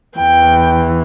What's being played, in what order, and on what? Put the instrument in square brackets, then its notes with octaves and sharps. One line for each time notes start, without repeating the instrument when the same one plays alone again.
[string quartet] E2 E3 G5